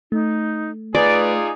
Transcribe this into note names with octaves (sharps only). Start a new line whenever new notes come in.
A3 D#4
D#4 F4 G#4 B4 D5